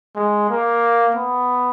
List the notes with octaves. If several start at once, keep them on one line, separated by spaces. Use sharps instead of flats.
G#3
A#3
B3